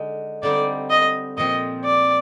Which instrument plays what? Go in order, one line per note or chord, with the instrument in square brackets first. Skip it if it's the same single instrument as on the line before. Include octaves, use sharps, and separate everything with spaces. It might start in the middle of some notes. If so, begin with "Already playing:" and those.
Already playing: [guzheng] D3 G#3 D#4
[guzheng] D3 G3 C4 D#4 [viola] D5
[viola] D#5
[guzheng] A#2 F3 C4 [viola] D#5
[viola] D5